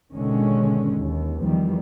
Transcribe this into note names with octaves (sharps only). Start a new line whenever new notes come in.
G#1 B2 D3 D#3 G#3 C#4
D#2
E2 D#3 F3 G3